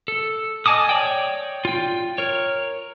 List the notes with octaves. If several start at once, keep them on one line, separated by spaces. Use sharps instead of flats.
A4
D#5 G#5 A5 D6 D#6
C#5 D5 G5
F4 G5
A#4 C#5